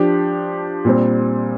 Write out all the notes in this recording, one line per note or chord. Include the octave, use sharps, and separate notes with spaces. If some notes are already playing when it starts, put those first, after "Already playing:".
Already playing: F3 D4 G4
A#2 G3 C4